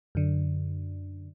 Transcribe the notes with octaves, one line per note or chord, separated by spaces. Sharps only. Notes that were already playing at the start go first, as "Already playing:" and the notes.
F#2 D3